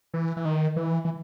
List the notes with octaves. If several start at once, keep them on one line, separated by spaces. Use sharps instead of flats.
E3
E3
D#3
E3
E3